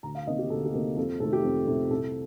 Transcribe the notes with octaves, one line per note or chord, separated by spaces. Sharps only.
D2 A#5
F5
C3 D#3 A#3 D#5
G4
D2 A4
G4
C3 D#3 A#3
F2 A4
C3 D#3 A3 A4
G4
F2
C3 D#3 A3
C2 A4